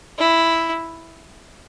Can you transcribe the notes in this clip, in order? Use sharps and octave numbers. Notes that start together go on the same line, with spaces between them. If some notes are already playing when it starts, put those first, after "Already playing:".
E4